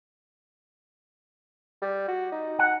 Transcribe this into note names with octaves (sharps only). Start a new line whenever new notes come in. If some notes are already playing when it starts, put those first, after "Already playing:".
G3
F#4
D#4
F#5